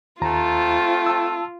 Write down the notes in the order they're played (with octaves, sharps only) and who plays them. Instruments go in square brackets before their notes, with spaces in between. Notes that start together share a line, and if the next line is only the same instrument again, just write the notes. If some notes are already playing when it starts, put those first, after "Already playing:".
[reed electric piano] D#2 A#5 [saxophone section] A3 C4 [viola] F4
[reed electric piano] A5 E6